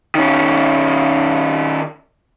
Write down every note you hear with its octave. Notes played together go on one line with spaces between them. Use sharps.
D#3 C#4